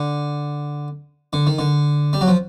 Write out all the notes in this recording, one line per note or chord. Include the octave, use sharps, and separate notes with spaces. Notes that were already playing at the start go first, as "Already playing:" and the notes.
Already playing: D3
D3
D#3
D3
G3
F#3
F3